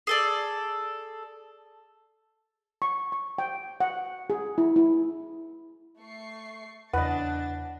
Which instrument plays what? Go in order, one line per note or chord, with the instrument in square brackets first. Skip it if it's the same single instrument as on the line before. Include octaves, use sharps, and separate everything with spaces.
[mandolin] G#4 A4 D5
[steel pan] C#6
C#6
G5
F#5
G#4
E4
E4
[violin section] A3 C#6 C7
[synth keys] E2 C#3 [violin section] D4 A6 [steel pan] B4 D#5 [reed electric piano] F#5